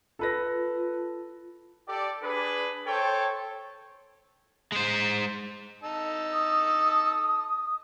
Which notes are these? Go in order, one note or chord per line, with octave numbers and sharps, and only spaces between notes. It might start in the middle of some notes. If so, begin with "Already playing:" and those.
F4 A4 B4 A#6
G4 A4 D5
D4 G#4 B4
A4 C5 C#5 G5
G#3 C5
D#4 A5 E6
D#6